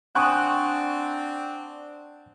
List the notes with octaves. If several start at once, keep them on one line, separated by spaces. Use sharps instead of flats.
C4 D4 F#5 G#5 C#6 D#6 F#6